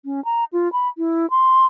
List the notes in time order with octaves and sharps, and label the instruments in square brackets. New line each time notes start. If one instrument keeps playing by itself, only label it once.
[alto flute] C#4
A#5
F4
B5
E4
C6